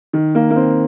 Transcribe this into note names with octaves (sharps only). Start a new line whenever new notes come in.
D#3
A#3
A#3
C4